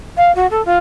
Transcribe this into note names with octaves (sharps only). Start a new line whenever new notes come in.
F5
F#4
A4
F4